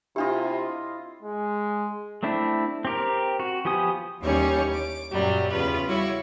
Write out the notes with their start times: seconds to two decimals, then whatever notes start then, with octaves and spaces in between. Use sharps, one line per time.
0.16 C3 D4 E4 F4 G4 D#5
1.23 G#3
2.23 A3 C4 D4 E4
2.85 C4 G4 A#4
3.40 F#4
3.65 F3 B3 G4 G#5 D#6
4.23 D#2 E3 G3 C#4 C#5
4.75 D6
5.12 F#2 A#2 F#3 G3
5.51 E2 C#3 F4 B4
5.87 G3 E4 F#4 C#5